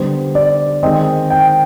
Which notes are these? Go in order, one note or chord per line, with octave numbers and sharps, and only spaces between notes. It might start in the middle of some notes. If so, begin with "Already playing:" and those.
Already playing: D3 G3 B3 C5
D5
D#3 G#3 C4 D#5
G5